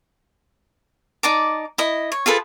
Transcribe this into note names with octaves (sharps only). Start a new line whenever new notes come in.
D#4 D5 A5 D6
E4 D#5
C#5
F4 G#4 A4 B4